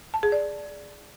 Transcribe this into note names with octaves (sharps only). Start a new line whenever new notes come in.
A5
G#4
D5